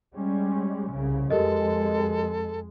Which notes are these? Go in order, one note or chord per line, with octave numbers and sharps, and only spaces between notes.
G3 G#3 C#4
C2 C#3
F2 G#3 G4 A4 A#4 D#5